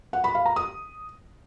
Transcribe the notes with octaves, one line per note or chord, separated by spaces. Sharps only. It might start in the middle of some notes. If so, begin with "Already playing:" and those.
F#5
B5
F5
A#5
D#6